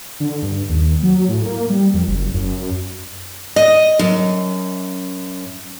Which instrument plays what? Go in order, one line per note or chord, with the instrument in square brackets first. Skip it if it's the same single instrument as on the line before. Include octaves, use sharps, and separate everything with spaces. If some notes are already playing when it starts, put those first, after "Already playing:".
[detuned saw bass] D3
G2
D#2
F#3
A2
A#3
G3
F2
F#1
F#2
[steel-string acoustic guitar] D#5
F#2